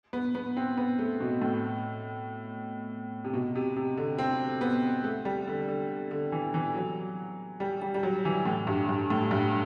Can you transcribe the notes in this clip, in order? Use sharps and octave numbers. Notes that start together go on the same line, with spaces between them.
B3
B3
C4
B3
A3
B2
A2
C3
B2
C3
C3
D3
C4
B3
A3
G3
D3
D3
D3
E3
E3
F#3
G3
G3
G3
F#3
E3
A2
G2
G2
A2
G2